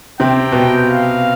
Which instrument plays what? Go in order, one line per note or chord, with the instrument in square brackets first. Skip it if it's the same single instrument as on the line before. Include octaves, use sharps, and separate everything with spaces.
[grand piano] C3 C4 [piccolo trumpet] G5
[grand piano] B2 B3
[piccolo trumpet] F5